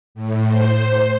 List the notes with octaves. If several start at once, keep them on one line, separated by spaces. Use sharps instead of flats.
A2
C5